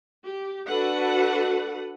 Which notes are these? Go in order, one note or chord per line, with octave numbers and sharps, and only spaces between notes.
G4
D4 F#4 A4 B4 F#5